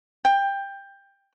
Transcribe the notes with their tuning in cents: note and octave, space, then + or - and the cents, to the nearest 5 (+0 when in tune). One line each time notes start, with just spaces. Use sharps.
G5 +15